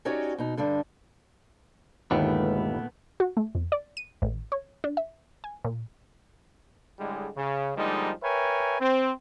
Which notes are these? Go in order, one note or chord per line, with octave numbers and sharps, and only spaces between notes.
C#4 D#4 F#4 G4 C#5 D5
B2 D#4
G2 D3 G3 D4
G1 D#2 A#2 D#3 G#3 A3 B3 B4
F#4
A3
F2
D5
D#7
A1
C#5
D4
E5
G#5
A#2
A2 D3 G3 G#3
C#3
D3 F3 G3 G#3 A#3 D#4
A#4 B4 C#5 E5 G5 G#5
C4